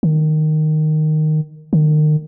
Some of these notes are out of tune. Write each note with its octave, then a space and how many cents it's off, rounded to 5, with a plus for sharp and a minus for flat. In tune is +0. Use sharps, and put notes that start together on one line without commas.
D#3 -10
D#3 -35